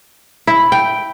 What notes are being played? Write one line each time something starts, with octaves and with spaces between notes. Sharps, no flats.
E4
G5